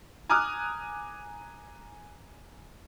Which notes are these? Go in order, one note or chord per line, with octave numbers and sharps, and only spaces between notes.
G#5 A#5 D6 D#6 F6 F#6